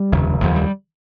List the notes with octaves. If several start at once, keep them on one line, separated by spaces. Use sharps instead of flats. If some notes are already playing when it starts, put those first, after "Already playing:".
Already playing: G3
F1 D#2 C#3
F1 D#2 C#3 F3
G3